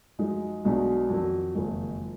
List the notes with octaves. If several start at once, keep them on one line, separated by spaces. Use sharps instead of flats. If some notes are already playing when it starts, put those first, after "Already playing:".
F#2 F3 G#3 D#4
B1 B2 G#3 D4 F#4
F2 D#3 F#3
F#1 F2 D#3 G#3